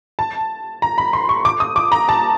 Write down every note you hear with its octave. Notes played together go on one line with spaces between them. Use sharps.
A5
A#5
B5
C6
C#6
D6
D#6
D6
A#5
A5